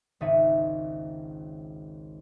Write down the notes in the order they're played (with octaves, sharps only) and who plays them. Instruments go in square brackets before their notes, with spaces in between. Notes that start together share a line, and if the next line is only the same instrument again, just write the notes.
[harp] G#1 C#2 D5 E5 C#7 D#7